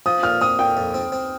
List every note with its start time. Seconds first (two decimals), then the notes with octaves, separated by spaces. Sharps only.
0.06 F3 D#6
0.23 A#2 F6
0.41 C4 D#6
0.59 A#2 G5
0.77 F2
0.94 C4
1.12 C4